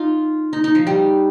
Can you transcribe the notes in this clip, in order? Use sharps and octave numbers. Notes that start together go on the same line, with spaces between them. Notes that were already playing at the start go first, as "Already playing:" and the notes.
Already playing: D#4 F4
D#4
D#4
F3
G3